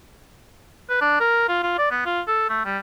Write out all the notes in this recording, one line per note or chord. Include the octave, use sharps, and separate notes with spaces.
B4
D4
A#4
F4
F4
D5
B3
F4
A4
A3
G3